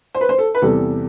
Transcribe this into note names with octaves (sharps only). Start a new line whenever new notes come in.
C5
B4
C5
A4
B4
E2 C3 G3 A4